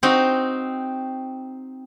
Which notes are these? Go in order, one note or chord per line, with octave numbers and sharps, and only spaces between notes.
C4 D#4 F#4